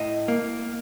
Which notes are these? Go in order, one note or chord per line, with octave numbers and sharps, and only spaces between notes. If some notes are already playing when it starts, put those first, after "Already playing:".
Already playing: A2 D#5
A#3